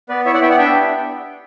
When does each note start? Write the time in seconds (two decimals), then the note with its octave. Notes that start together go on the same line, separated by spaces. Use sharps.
0.09 B3 B4 D5
0.25 E4 C#5 E5
0.34 D5 F#5
0.42 B3 E5 G5
0.50 D5 F#5
0.58 D4 E5 G5
0.75 G4